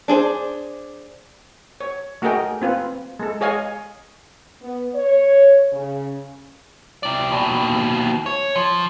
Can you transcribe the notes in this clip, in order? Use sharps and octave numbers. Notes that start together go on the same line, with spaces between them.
D4 G#4 C5
C#5
A3 F#4 G#4 A#4 D#5 G5
C4 F4 B4
G#3 A4
G#4 C#5 D#5 F5 G#5
B3
C#5
C#3
C3 D5
D#2 B2
C#5
F3